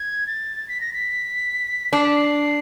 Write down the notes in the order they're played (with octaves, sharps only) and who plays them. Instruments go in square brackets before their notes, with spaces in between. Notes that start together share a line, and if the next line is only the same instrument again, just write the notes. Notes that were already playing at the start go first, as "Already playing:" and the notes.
Already playing: [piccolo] G#6
A6
B6
A#6
B6
[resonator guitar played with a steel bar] D4 [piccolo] C7
[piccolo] B6
C7